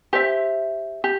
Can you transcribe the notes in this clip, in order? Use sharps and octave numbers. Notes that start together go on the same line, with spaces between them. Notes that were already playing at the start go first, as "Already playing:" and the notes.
G4 C5 E5
G4